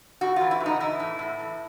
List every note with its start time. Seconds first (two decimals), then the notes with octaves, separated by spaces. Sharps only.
0.21 A2 F#4
0.36 E3 F4
0.51 E4
0.61 A2
0.66 D#4
0.80 E3 E4
1.00 A2
1.19 A2
1.39 E3